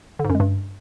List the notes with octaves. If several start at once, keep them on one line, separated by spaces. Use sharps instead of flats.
D3
G#2
F#2
G#3
G2